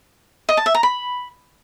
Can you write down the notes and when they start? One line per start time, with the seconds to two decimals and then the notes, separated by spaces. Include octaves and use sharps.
0.49 D#5
0.57 A5
0.66 E5
0.75 A#5
0.83 B5